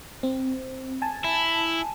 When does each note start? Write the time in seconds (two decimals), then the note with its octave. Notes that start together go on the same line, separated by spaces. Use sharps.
0.23 C4
1.02 G#5 A5
1.24 E4